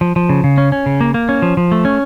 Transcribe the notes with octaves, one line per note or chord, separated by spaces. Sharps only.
F3
F3
C#3
C#3
C#4
C#4
C#3
A#3
A#3
C#4
F3
F3
A3
C#4